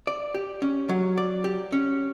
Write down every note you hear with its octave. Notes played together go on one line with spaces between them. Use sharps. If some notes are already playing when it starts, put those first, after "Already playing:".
D5
G4
C#4
F#3
D5
G4
C#4